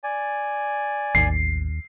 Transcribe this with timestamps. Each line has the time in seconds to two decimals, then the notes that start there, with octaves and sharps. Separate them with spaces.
0.04 D5 G#5
1.15 A1 D#2 C7